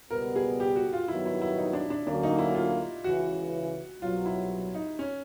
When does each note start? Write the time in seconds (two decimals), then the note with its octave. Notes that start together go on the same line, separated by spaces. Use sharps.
0.11 C#2 B2 G3 B3 A#4
0.36 G#4
0.60 G4
0.76 F#4
0.93 F4
1.08 G2 D#3 F#3 B3 E4
1.26 E4
1.42 E4
1.58 D#4
1.73 D4
1.90 D4
2.06 D2 D3 F#3 A#3 C#4 D4
2.23 D#4
2.38 E4
2.55 F4
3.04 C#2 C#3 E3 F#4
4.01 C2 B2 F#3 F4
4.26 E4
4.75 D#4
4.99 C#4